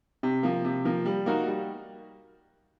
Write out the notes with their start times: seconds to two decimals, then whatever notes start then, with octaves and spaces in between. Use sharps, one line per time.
0.23 C3
0.43 F3 A#3
0.65 C3
0.85 F3 A#3
1.05 G3
1.26 A#3 D#4 F#4 A#4
1.47 G3